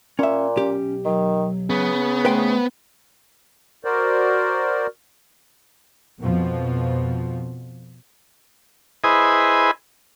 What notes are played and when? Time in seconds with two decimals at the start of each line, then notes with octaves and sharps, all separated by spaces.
0.19 A#2 C#4 E5
0.56 B1 C#4 G4
1.05 D#3 F#3
1.70 C#3 B3
2.25 A3 B4 C5 G5
3.85 F#4 A#4 C5 D5
6.21 F2 B2 F3
9.04 E4 G#4 B4 C5 D#5 G#5